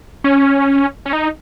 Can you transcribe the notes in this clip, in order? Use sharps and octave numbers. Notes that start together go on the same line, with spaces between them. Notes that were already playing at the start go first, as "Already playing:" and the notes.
C#4
C#4
D#4